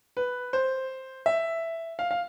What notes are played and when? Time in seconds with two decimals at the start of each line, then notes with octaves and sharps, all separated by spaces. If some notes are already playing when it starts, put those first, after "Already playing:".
0.17 B4
0.53 C5
1.26 E5
1.99 F5
2.11 F5